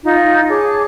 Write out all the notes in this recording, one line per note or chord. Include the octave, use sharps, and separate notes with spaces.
D#4 F4
G#4 C#5 A5 D6